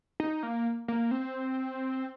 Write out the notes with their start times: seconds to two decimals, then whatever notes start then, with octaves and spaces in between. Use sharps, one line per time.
0.20 D#4
0.43 A#3
0.88 A#3
1.11 C4